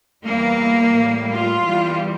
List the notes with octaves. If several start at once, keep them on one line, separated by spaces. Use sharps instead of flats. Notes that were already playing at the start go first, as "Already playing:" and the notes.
E2 E3 G3 A#3
A2 G3
F4
E2 E3 G3